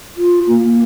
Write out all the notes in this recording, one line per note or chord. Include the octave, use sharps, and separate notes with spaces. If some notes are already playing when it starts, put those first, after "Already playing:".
F4
A#3